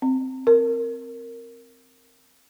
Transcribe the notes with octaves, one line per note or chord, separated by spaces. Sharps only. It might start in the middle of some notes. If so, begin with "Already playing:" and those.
C4
A#4